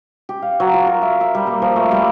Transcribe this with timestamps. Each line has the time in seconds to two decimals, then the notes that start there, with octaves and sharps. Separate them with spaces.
0.29 G4
0.42 F5
0.60 F#3
0.73 F4
0.87 A#4
1.02 E5
1.21 E5
1.35 G3
1.47 A#3
1.62 F3
1.76 A3
1.91 G3